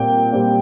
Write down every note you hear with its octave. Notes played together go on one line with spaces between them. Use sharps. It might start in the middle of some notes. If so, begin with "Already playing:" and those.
Already playing: A#2 G3 C4 G5
A#2 G3 C4